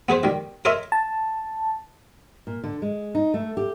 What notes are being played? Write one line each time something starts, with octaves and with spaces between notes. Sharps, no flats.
B3 G#4 B4 C5
D#3 G3
A#4 C#5 D#5 E5 A#5 C6
A5
A#2
D3
G#3
D#4
A3
G4